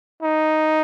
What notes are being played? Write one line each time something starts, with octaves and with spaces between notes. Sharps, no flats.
D#4